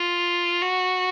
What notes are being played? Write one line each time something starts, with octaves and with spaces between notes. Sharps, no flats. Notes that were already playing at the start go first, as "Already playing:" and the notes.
Already playing: F4
F#4